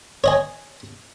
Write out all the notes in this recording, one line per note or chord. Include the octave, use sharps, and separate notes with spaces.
C#5 D#5 G#5